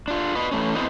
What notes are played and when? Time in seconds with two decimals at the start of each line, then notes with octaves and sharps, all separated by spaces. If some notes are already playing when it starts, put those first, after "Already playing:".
0.08 D4 F4
0.35 B4 D#5
0.51 E3 A3 C#4
0.75 B3 C4 E4 B4 C5 D#5